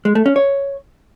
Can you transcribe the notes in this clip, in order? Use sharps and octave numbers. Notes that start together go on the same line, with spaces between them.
G#3
A3
C#4
C#5